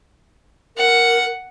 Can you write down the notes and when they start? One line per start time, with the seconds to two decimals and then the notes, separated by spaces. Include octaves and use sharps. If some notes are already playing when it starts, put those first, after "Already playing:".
0.77 A#4 F#5